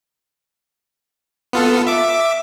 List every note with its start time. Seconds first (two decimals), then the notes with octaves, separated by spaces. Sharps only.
1.53 B3 F4 A4
1.87 E5 D6